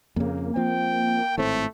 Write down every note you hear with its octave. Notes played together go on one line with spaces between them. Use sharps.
F2 C#3 A#3
F3 C4 G5
G#1 A2 A3 C4